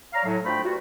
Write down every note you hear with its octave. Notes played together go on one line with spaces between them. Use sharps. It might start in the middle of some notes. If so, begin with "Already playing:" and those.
C#5 D5 F5 A#5
A2 F#3
D2 F3 A3 D4 G5 B5
G2 F4 F#4